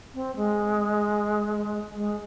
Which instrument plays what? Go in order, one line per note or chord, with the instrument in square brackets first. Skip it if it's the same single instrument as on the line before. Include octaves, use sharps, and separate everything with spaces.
[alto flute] C4
G#3
G#3